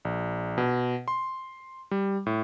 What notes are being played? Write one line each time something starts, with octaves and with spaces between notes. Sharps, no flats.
A#1
B2
C6
G3
A2